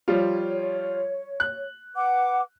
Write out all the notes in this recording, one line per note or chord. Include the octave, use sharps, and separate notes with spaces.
F3 G3 F4 C#5
F#6
B4 F#5 D6